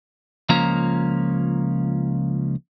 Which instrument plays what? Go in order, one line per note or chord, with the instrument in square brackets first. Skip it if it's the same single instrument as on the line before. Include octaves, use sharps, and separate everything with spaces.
[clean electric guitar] C#2 F3 A#3 C#4 A#5